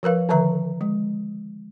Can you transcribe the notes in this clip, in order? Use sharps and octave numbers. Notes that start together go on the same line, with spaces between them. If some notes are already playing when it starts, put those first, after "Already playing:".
F3 A#4 B4 F5
D3 D#3 F3 B4 E5 A#5
G#3